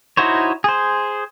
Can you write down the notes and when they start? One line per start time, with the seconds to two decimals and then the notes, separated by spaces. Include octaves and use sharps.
0.17 D#4 E4 F#4 C5 C#5
0.64 G#4 C5